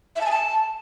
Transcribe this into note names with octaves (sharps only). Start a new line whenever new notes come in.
E5
A5
G#5
A5